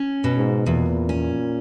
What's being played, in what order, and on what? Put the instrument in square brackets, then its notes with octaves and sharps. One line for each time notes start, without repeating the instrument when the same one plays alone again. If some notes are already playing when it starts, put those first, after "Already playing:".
Already playing: [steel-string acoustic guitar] C#4
B2
[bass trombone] G#2
[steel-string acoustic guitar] E2 [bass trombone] A#2
[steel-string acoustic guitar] C#4